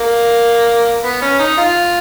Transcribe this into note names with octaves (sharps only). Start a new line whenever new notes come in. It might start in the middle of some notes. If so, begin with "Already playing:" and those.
Already playing: A#3
B3
C#4
D#4
F4